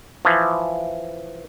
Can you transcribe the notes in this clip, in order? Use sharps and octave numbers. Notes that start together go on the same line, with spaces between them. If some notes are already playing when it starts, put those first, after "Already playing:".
E3 F3